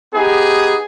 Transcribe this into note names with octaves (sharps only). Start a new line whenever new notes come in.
B3 D#4 G4 G#4